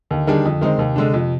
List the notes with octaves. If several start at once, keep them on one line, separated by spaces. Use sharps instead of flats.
D#2 D3
D#3 G3 D4 G#4
F2
D#3 G#3 C4 D#4
D#2 C3
D3 G#3 D4
F2